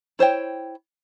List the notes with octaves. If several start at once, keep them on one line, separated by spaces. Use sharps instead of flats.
E4 C5 C#5 G5